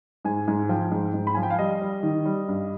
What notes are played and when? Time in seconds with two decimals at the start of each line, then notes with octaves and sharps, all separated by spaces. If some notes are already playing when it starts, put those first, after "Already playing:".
0.25 G#2 G#5
0.48 G#2 G#5
0.69 F3 G5
0.91 G#2
1.14 G#2
1.27 B5
1.34 F3 G#5
1.43 G5
1.50 F5
1.58 G3 D#5
1.81 G3
2.03 D#3
2.26 G3
2.48 G2